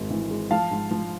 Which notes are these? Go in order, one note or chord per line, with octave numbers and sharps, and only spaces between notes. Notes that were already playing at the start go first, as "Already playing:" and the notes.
Already playing: G#1 G#3
E3
G#3
F3 F5 A5
G#2
F3